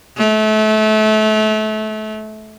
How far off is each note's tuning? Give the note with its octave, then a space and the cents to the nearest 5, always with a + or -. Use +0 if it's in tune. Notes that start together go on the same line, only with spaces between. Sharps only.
A3 -30